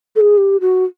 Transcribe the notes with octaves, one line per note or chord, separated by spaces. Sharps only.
A4
G#4
G4
F#4